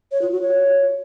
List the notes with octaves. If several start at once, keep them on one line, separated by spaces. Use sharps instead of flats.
C#5
F4
F#4
C#5